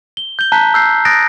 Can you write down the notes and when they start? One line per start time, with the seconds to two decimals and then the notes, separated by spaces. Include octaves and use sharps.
0.17 G7
0.39 G6 G7
0.52 A5 A#5 F#6 G6 B6
0.74 E6 F#6 G6 C7
1.05 D#6 F#6 A6 A#6 D7